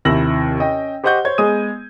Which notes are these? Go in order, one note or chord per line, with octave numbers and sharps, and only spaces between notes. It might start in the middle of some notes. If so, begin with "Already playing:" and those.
D#2 C3 E4 E6 A#6 F#7
C#4 D#5 G5
G4 C5 D#5 F#5 C#6 G6
C5 C#5 G#6
G#3 B3 G#4 D#6 D#7